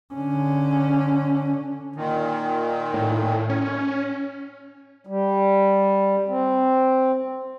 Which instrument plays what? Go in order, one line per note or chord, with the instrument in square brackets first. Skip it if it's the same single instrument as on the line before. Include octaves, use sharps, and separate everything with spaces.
[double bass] D3 C#4
[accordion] A#2 D#3
[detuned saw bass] A2
C#4
[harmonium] G3
C4